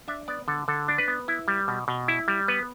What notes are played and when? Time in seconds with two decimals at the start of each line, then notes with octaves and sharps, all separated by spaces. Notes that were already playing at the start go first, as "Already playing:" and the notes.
0.08 D4 E5
0.28 B3 D5
0.48 D3 A4
0.68 D3 A4
0.88 D4
0.98 B4
1.08 B3
1.28 E4
1.48 G3
1.68 B2
1.88 B2
2.08 E4
2.28 G3
2.48 B3 B4